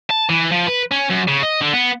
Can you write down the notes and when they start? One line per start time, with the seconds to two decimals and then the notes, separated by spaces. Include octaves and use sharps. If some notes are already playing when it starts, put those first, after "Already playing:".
0.11 A5
0.30 E3
0.52 F3
0.67 B4
0.91 C#4
1.10 F#2
1.28 C#3
1.43 D#5
1.61 D3
1.73 B3